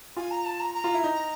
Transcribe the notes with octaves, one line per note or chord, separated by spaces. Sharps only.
F4 G#5
A#5
A5
A#5
A#5
F4
E4
D#4